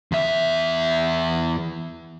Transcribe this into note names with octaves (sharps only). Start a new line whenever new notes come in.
E2 E5